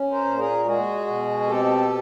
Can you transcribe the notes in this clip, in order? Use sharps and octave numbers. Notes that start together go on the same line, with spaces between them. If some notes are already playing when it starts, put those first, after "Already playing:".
Already playing: C#4
A#4 C5
A#2
G#4 A#4
G#3 F#4 G#4
B2
C4 G4 A4